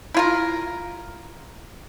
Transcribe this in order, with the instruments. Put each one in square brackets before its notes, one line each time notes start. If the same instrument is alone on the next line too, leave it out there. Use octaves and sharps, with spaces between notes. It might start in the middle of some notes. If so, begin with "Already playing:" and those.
[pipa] E4 F4 A#4